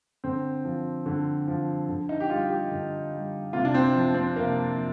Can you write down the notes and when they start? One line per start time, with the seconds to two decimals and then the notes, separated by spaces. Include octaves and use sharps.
0.24 D3 C4
0.65 F3
1.06 D3
1.48 F3
1.89 D3
2.09 D#4
2.20 G4
2.30 G3 F4
2.50 G4
2.71 D3
3.12 G3
3.53 C3 F4
3.65 D4
3.74 C4
3.94 F3
4.14 C4
4.36 C3 A#3
4.76 F3